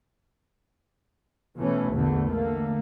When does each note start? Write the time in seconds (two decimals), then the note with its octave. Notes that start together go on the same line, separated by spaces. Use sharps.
1.57 B2 E3 A3 C#4
1.93 A#1 E2 D3 A3
2.28 D3 A3 A#3